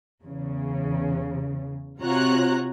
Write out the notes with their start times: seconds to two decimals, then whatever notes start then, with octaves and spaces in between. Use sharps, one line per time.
0.24 E2 C#3
2.00 C3 F4 F#4 C#5 A#5 F#6